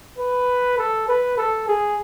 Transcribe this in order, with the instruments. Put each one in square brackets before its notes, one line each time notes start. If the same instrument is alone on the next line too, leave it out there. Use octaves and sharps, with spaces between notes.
[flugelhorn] B4
A4
B4
A4
G#4